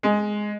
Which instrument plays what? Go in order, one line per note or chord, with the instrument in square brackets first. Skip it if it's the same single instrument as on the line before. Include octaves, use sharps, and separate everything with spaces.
[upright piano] G#3